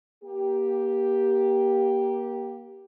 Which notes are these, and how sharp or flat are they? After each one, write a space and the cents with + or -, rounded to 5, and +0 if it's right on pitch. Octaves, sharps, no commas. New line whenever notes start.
A#3 +25 G4 +0